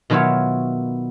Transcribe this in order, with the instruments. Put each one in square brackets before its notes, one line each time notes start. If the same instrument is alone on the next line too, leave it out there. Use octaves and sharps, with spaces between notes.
[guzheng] B2 D#3 F#3 F4 C#5 E5